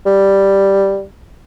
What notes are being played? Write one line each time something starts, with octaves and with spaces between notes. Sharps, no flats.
G3